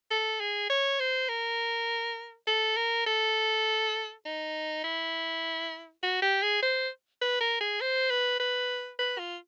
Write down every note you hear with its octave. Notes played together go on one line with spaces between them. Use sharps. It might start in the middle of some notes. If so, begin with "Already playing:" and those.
A4
G#4
C#5
C5
A#4
A4
A#4
A4
D#4
E4
F#4
G4
G#4
C5
B4
A#4
G#4
C5
B4
B4
B4
F4